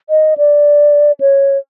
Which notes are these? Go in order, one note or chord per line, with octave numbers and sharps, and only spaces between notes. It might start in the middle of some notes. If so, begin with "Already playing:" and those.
D#5
D5
C#5